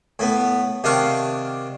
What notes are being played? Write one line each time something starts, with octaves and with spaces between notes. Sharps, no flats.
A2 A3 B3
C3 D#3 D4 F5 F#5 C#6